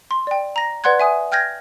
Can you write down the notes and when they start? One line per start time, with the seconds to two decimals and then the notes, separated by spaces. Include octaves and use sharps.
0.11 C6
0.27 D5 G5
0.56 A#5 A#6
0.84 B4 D5 F#5 C6 F#6 G#6
1.00 E5 G#5 D#6
1.32 G5 F6 G6 G#6 A#6